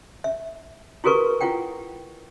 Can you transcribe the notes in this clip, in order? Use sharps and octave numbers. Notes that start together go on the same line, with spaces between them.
E5
E4 F#4 G#4 A#4 B4 C#6
E4 F4 F#5 G5